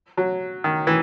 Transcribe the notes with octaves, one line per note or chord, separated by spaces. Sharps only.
F#3
D#3
E3